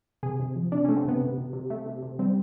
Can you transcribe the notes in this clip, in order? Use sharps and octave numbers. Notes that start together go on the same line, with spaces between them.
C3 G#4
C3
F3
C3 D4
A3 C#4
C4
C3 B3
C3
C3
C3
A3
C3
C3
G3 C4